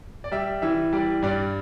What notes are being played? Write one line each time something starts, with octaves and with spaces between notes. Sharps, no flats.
D5
G3 E5
E3 E5
G3 D5
G2 D5